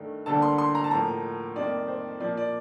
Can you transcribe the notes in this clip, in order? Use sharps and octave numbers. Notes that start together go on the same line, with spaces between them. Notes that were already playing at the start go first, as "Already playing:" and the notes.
Already playing: G2 D#3 A3
D2 D3 G3 A#3 A5
C6
C6
A#5
A5
A2 F3 A#3 A#5
F2 D#3 G3 A#3 D5
C5
A#2 F3 A#3 D5
D5